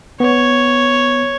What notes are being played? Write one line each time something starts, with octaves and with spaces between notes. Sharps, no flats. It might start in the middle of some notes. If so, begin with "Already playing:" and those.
B3 C#5